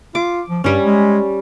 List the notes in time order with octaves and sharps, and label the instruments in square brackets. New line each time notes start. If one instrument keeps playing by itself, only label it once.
[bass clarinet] F4 [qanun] D6
[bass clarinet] F3
[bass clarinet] G2 [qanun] G3 C#4
[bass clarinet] G#3